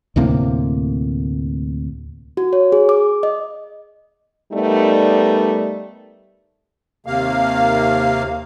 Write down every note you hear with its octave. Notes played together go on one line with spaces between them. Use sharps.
D2 A2 C3 A#3
F#4
C#5
G#4
D6
D#5
G3 A3 B3 D#4 A#4 D5
D#2 C3 A#3 F5